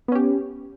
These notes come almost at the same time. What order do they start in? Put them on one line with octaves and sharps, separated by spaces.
B3 C#4 G4